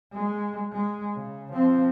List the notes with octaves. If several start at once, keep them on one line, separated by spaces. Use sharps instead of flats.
G#3
G#3
C#3
F3 C4